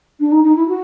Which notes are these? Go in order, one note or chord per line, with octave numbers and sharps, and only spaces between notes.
D4
D#4
D#4
E4
F#4